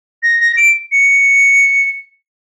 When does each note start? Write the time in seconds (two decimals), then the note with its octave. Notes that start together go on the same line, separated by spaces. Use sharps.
0.23 A#6
0.40 A#6
0.57 D7
0.92 C#7